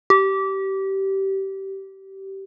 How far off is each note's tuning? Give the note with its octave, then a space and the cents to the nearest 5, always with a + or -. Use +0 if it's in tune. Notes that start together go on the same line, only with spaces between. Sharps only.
G4 -20